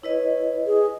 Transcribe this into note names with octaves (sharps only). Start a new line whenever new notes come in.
E4 B4 C#5 D#5
G#4